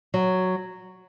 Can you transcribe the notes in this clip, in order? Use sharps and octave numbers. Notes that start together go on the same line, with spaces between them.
F#3